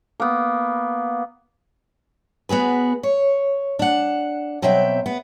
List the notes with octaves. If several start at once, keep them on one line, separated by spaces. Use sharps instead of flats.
A#3 B3
B3 F#4 G#4 B4
C#5
D4 F#5
B2 F#3 C4 E5 G5
B3